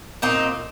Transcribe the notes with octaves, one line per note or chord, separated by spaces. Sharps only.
A#2 C4 D#4